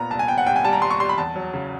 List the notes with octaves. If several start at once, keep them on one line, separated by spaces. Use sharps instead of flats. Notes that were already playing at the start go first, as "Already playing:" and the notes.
Already playing: A#2 B3 A#5
C2 A5
G#5
B3 G5
F#5
C2 G5
G#5
G3 A5
A#5
G3 C6
C#6
G3 C6
B5
E2 A5
F#3
C#3